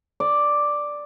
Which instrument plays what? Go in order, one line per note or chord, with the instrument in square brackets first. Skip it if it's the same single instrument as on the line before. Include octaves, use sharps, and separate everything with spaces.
[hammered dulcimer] D5